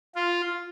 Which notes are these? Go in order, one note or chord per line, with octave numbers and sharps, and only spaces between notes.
F4